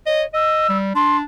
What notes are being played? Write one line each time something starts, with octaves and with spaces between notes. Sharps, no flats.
C#5 D#5
D#5 E6
G3
D4 C6